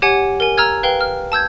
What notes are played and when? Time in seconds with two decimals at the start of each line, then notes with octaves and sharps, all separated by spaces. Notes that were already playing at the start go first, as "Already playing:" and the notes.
0.02 G4 C#5 F#5 G#5
0.40 A#4 G#5
0.58 A#5 E6 F6 G#6
0.83 B4 F5 G5 G7
1.01 F6
1.32 A5 E6 G6 G#6